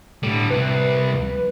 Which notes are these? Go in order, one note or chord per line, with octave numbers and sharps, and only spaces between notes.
A2 D3 G3
C2 B4